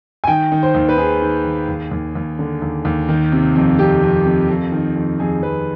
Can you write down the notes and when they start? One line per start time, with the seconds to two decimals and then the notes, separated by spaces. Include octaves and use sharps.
0.24 G#5
0.27 D#3 G5
0.52 D#3
0.63 C5
0.75 D#2
0.89 B4
0.97 D#3 G#4
1.22 D#3
1.45 D#3
1.69 D#2
1.91 D#2
2.15 D#2
2.39 D3
2.62 D#2
2.85 D#2
3.09 D#3
3.32 C3
3.55 F2
3.79 F2 G4
4.02 F2
4.25 F2
4.49 F2
4.72 D#3
4.96 F2
5.20 F2 G#4
5.43 F2 B4